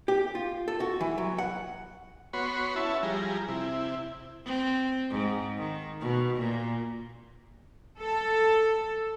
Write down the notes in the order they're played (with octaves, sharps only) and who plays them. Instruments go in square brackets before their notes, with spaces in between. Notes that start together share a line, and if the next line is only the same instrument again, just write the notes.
[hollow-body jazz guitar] G4
F4
A4
F#4
E3
F#3
F#5
[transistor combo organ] B3 F#4 C#5 B5 C6
C#4 E4 E5 A5
F3 G3 G#4 A#5
C3 E4
[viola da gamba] C4
G#2
D#3
B2
A#2
[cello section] A4